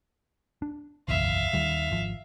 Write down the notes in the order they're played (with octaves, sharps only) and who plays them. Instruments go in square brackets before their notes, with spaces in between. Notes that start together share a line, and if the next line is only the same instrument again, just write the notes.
[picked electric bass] D4
[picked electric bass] F#1 B1 E2 [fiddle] E5 F5
[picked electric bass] D#2 D#3 G3
G#1 F3